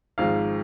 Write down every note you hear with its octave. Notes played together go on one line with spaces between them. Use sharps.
G#1 G#2 F3 G#3 F5